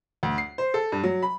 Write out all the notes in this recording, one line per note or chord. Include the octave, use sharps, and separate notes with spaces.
D2
C7
C5
A4
G2
F#3
B5